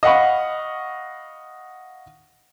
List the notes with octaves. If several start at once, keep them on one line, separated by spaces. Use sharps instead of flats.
D#5 F5 F#5 B5 C#6